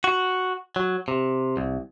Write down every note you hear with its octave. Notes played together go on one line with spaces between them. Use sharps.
F#4
F#3
C3
C2